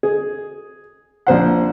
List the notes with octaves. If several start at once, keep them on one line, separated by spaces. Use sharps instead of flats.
G#4
A#1 C5 F#5